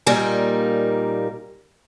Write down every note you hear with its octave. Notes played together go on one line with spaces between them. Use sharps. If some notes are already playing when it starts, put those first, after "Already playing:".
A#2 G3 A#3 D#4 G#5